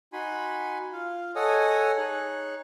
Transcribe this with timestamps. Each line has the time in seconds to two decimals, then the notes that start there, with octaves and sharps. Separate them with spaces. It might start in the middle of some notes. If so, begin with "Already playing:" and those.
0.13 D#4 F#4 G#5 B5 C6
0.92 F4 F5
1.36 A4 C#5 D#5 F#5 G#5 D#6
1.97 D#4 G#4 C#5 F#6